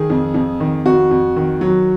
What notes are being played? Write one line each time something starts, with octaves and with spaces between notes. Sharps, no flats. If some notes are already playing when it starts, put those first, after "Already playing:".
Already playing: D#3 G#4
F2
F2
D#3
F2 F#4
F2
D#3
F#3